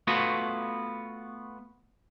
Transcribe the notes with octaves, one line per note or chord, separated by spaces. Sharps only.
A3 B3 F4 F#4